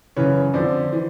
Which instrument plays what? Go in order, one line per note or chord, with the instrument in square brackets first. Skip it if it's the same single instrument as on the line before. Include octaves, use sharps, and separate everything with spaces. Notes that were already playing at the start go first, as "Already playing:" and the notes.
[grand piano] F#2 C#3 E3 B4 C#5
F2 D3 F3 C5 D5
E3